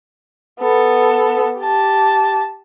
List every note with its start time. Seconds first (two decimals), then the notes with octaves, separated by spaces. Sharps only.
0.60 B3 A4
1.58 G4 A5